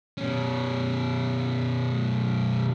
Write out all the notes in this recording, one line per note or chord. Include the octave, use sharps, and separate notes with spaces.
B2 C#4